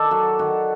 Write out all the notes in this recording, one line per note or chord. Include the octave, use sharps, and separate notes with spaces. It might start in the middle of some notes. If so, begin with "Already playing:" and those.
Already playing: D#3 A4 D5
F#3 F#4
D#3 F#4